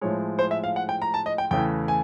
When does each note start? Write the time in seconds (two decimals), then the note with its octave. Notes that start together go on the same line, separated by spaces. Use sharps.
0.01 A2 F3 G#3 C#5
0.39 C5
0.51 E5
0.64 F5
0.76 F#5
0.89 G5
1.02 A#5
1.14 A5
1.26 D#5
1.38 G5
1.51 E2 C#3 E3 A3 G5
1.88 G#5